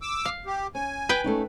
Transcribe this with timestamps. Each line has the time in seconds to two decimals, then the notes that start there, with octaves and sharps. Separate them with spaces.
0.02 D6 E6
0.25 F5
0.46 G4
0.75 C#4 G#5
1.09 B4 G5
1.24 A3 C#4 D#4